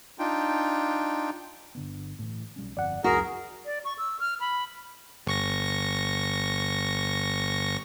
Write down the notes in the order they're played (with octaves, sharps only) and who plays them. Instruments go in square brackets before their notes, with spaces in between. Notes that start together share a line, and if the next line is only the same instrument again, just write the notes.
[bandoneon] D4 D#4 F4 G5
[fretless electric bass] G1 D3 B3
A2 E3
B1 G3 C#4
[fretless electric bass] G1 F2 [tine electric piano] D5 F#5
[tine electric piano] C#2 [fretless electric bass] F#2 [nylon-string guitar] F#4 [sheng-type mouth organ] G#4 A#4 A#5
[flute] D5
C#6
E6
F6
B5
[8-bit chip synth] G1 C#6 A#6